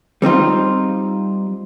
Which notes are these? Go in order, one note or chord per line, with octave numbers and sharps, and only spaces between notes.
G3 C4 D#4 F4